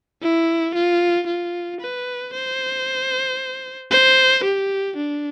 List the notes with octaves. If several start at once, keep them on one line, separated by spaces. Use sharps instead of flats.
E4
F4
F4
B4
C5
C5
G4
D4